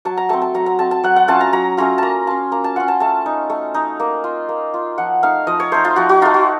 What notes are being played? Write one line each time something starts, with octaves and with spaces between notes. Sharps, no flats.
F#3 A5
A#5
A3 C4 A5
A5
F#3 A#5
A#5
A3 C4 A5
A5
F#3 F#5
F#5
A3 C#4 F4 A5
A#5
F#3 A#5
A3 C#4 F4 A#5
A#3 A5 A#5
C#4 F4 A5
A#3 A#5
A5
C#4 F4 F#5
A5
A3 A5
D#4
A3
D#4
A#3
F4
A#3
F4
F3 F#5
A3 D#4 F5
F3 D#5
C#5
A3 D#4 C5
F4
F3 F#4
F#4
A3 D#4 F4
F#4